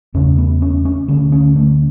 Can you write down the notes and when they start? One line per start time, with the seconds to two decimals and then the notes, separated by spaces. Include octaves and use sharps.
0.14 E2 C#3 C#4
0.38 B3
0.62 C#4
0.85 C#4
1.08 D2 D3 C#4
1.32 C#4
1.56 A3